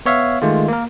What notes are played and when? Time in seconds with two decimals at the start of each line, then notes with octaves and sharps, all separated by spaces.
0.06 B3 C#5 E5 F5
0.42 D#3 G#3 A3 F4
0.68 A#3 A#4